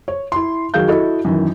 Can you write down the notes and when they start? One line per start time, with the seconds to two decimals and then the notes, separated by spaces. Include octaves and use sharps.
0.08 C#5
0.32 E4 C6
0.74 D#3 F#3 F#4 G#4 F5 G6
0.88 E4 F#4 A4 D#5
1.25 F#2 D#3 E3